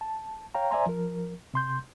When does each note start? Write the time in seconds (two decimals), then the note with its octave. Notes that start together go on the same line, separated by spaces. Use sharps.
0.01 A5
0.55 C#5 F5 G5 A#5
0.71 C5 D5 E5 G#5 A#5 C6
0.87 F3 A#4
1.54 C3 C6 G6